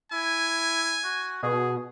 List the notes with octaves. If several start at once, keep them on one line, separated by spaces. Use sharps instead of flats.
E4 G#5
F#4
B2 G#4